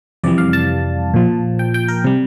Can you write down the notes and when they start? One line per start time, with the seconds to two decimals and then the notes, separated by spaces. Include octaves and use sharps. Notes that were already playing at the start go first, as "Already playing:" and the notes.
0.24 F2 C3 E3 G3 D5
0.38 F5
0.53 A5
1.14 A#2 F3
1.59 G5
1.74 G5
1.88 A#4
2.04 C3 G3